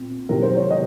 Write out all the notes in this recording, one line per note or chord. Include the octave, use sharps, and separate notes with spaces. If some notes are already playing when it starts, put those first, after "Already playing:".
Already playing: A#2 C4
C3 D#3 F#3 A#4
C5
C#5
D#5